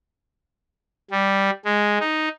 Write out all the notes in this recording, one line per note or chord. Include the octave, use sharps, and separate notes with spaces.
G3
G#3
D#4